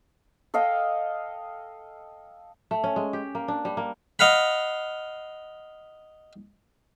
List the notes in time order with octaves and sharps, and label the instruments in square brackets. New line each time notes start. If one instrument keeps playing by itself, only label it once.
[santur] A4 D#5 F5 G5
[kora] A3
C#4
G#3
G4
A#3
D4
G3
A#3
[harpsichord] D#5 F5 F#5 B5